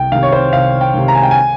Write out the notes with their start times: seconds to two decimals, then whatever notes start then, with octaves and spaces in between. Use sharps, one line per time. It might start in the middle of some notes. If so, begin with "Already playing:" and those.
Already playing: C2 G5
0.12 D#3 F5
0.15 C3
0.23 C#5
0.32 C5
0.53 C2 F5
0.81 G5
0.94 C3 D#3
1.08 A#5
1.15 G#5
1.23 G5
1.31 G#5